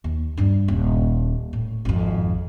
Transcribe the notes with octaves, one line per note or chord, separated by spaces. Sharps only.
D#2
G2 G3
D#1
A2
G#1 F2